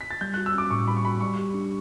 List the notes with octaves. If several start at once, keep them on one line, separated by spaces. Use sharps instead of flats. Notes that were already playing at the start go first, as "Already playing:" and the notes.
B6
A6
G3 G6
F#4 F#6
E6
C#4 D6
A2 C#6
G3 B5
C#6
F#4 B5
G3 C#6
G4
D4